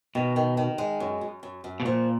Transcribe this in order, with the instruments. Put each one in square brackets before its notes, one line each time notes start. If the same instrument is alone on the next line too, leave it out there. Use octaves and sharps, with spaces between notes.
[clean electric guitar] B2 [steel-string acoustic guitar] D#3
[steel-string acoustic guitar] D#3
D#3
G#3
F#2
F#2
F#2
F#2
[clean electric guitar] B2
[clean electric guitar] A#2 [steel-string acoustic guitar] F3